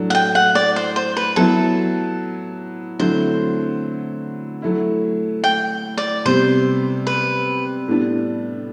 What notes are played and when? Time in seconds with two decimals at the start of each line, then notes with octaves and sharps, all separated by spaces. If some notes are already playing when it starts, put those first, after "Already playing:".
Already playing: A2 F#3 A3 D4
0.10 F#5
0.15 G5
0.35 F#5
0.55 D5
0.76 C5
0.96 C5
1.17 B4
1.36 F#3 B3 E4 A4
2.99 D3 F#3 A3 C4 E4 C5
4.62 F#3 A3 E4
5.44 G5
5.98 D5
6.26 C3 G3 B3 C5
7.07 B4
7.88 A2 G3 B3 D4